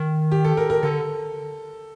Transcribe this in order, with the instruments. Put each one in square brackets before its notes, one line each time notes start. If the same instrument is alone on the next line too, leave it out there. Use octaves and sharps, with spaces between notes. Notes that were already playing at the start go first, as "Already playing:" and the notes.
Already playing: [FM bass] D#3
[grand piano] G4
A4
A#4
A#4
[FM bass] D3 [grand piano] A4